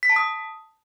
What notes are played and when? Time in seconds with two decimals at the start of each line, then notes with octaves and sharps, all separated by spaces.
0.03 B6
0.10 A5
0.16 D#6